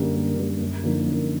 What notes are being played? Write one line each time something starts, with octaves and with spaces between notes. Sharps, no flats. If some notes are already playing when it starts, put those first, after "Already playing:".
Already playing: F#2 D3 G3 A#3
F#2
D3 G3 A#3
F#2
D3 F3 A#3 D#4
F#2